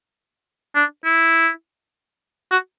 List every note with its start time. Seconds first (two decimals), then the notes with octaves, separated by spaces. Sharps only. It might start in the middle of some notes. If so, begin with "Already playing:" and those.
0.75 D4
1.05 E4
2.51 F#4